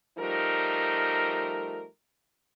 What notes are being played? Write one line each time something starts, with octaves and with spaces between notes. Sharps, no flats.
F3 G3 A3 D#4 A#4